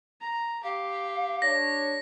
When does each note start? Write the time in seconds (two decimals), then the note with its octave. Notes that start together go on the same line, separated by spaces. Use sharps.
0.21 A#5
0.64 G4 F5
1.42 D4 C#5 A#6